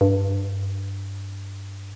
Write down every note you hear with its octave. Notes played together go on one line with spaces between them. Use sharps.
G2